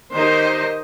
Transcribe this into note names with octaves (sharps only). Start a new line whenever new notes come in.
D#3 D#4 G4 C5 D#5